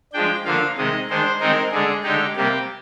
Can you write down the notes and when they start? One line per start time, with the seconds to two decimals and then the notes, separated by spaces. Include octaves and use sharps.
0.13 F3 G#3 D4 G5
0.45 D3 F3 A#3 D4 F5
0.77 C3 D#3 G#3 D#5
1.08 D#3 G#3 D4 C5
1.40 D#3 G#3 C4 D#4 A#4
1.72 D3 G#3 D4 G#4
2.04 D3 G#3 D#4 G4
2.36 C3 G3 A#3 G4